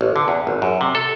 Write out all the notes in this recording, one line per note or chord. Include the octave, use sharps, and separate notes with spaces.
A1
D3
E2
G#1
F#2
C3
A4